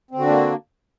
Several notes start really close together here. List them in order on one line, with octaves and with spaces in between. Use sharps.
C4 D3 F#4 D4 A#3